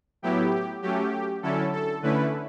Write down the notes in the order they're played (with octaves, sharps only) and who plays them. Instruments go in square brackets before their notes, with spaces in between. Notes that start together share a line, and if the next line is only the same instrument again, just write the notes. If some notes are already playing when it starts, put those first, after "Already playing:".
[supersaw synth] A2 F#3 B3 E4 G4
F#3 A3 C#4 G4
D3 F#3 C#4 E4 A4
A4
D3 A3 C#4 E4 B4